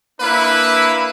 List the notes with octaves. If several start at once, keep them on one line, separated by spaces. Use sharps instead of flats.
A#3 D4 E4 B4 B5